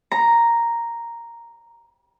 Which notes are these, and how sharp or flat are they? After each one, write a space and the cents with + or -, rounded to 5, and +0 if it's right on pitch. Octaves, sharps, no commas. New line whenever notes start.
A#5 +0